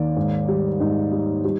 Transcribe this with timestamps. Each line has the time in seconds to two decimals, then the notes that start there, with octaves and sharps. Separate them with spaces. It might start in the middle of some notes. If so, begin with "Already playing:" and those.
Already playing: D#2 D#3 D5
0.17 G#2
0.48 G3
0.80 G#2 D#4
1.12 G3
1.44 G3